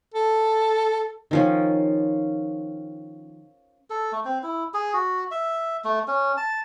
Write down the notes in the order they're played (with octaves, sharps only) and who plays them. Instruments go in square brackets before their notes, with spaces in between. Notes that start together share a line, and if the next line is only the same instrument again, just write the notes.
[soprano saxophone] A4
[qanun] D#3 F3 C#4
[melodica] A4
A3
C4
E4
G#4
F#4
E5
A3
C#4
A5